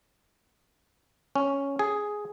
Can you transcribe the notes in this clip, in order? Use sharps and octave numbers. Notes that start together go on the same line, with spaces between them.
C#4
G#4